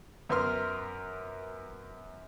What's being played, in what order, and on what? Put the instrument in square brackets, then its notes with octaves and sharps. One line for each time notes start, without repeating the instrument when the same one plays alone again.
[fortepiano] F#2 B3 A#4 C6 F6